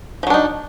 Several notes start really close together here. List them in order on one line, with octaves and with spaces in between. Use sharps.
F3 F#3 D4 D#4